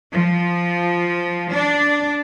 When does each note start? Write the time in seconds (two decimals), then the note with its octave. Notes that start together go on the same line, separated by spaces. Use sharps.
0.13 F3
1.53 D4